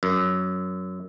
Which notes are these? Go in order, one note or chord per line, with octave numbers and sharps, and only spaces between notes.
F#2